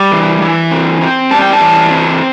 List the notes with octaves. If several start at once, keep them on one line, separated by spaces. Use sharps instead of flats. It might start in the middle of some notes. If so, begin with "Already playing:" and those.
Already playing: G3
E3
E3
C4
C4
G3 A5
G5
A5
E3
C4